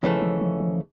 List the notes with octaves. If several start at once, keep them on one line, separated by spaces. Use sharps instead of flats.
D#2 C#3 E3 F3 A3 C#4
F3
F3
F3